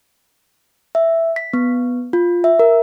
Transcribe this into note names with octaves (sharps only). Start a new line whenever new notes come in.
E5
B6
B3
F4
E5
A#4